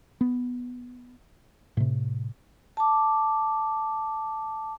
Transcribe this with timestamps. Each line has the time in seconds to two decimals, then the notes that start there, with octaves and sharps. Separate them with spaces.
0.21 B3
1.77 A2 C3
2.77 A5 D6